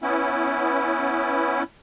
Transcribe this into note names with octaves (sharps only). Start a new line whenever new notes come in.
B3 C#4 E4